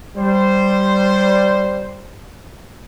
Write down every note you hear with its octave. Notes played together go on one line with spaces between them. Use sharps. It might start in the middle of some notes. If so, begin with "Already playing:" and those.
G3 C5